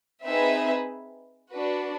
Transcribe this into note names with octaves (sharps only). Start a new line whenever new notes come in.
C4 D#4 G#4 B4 E5
D4 F#4 B4